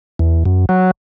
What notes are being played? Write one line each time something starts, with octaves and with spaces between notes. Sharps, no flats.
E2
F#2
F#3